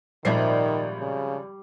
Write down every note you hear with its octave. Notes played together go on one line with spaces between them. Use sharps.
G#1 A#2 D#3 F3 G3 C5 E5 C7
C#3